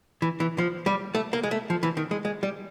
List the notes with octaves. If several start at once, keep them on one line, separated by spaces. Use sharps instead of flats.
E3
E3
F3
G3
A3
A#3
G#3
A3
F3
E3
D#3
G#3
G#3
G3